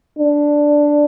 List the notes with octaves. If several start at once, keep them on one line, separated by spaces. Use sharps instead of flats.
D4